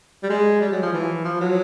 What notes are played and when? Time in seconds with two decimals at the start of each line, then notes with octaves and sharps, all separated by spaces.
0.23 G3
0.30 G#3
0.61 G3
0.72 F#3
0.82 F3
0.93 E3
1.24 F3
1.41 F#3